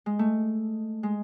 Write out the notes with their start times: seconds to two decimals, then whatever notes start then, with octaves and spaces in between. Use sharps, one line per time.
0.06 G#3
0.19 A3
1.03 G#3